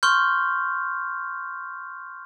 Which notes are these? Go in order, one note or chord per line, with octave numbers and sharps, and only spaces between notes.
C6 C#6 F6 G6